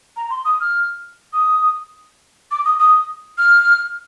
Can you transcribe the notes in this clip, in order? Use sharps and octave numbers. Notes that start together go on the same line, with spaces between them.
A#5
C6
D#6
F6
D#6
D6
D#6
D#6
F6